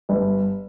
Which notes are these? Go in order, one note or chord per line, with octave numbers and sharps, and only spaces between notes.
G1